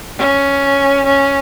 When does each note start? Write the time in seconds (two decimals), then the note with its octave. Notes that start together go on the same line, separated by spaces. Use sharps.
0.19 C#4
1.06 C#4